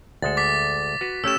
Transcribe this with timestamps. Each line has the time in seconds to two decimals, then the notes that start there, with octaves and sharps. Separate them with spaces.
0.22 D2 G#3 A4 A6
0.37 D6 A6 B6
1.01 F#4 B4
1.24 A3 C#4 G4 E6 E7